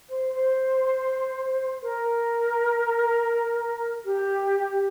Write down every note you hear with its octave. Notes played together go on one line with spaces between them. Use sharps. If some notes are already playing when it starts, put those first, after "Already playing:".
C5
C5
A#4
G4